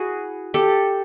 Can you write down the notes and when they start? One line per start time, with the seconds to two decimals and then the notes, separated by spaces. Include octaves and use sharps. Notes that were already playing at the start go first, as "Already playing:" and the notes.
Already playing: E4 F#4 G#4
0.54 G4 A4